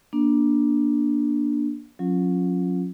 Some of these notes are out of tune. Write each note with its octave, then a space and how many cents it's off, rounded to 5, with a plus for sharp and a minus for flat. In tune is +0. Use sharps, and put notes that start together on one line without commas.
A#3 +30 D4 +0
F#3 -40 C#4 -20 F4 +0